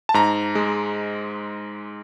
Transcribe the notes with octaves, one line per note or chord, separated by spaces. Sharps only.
A5
G#2 A#5
G#3